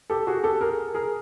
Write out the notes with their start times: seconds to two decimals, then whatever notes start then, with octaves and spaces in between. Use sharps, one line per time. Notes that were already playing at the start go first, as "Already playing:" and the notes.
0.10 G4 A4
0.27 F#4 G#4
0.43 G4 A4
0.61 G#4 A#4
0.95 G#4 A#4